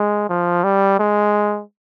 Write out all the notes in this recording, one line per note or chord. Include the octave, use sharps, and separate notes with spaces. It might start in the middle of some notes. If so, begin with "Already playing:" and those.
Already playing: G#3
F3
G3
G#3